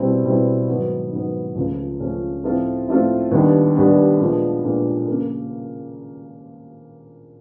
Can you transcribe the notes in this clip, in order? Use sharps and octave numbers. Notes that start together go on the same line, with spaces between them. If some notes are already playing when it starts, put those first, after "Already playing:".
Already playing: B2 G3 C4 E4
B2 G3 C4 E4
G#2 D#3 F#3 B3
G#2 D#3 F#3 B3
C#2 C#3 F3 A3 C#4
C#2 C#3 F3 A3 C#4
A2 F3 A3 C4 F4
A2 F3 A3 C4 F4
D#2 D#3 G3 B3 D4
D#2 D#3 G3 B3 D4
A#2 F3 G#3 B3 D4
A#2 F3 G#3 B3 D4
C#3 F3 A#3